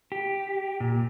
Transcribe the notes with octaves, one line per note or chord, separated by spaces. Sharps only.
G4
A#2